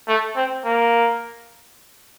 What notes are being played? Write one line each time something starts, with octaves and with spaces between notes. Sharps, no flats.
A3
C4
A#3